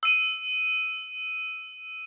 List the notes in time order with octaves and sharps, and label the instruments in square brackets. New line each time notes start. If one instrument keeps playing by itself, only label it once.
[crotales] E6 D#7